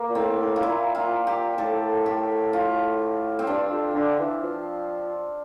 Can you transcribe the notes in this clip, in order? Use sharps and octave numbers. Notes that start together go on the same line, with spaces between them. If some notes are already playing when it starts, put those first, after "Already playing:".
Already playing: A#3
A#2
A2 C4
A2
F4
A#2 E4
F4
G4
A2 A4
G4
F4
C4
G2 D4
F2
D3
E3
F3